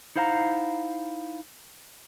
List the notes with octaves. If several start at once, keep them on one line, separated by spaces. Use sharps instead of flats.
D#4 E4 C5 F5 F#5 A#5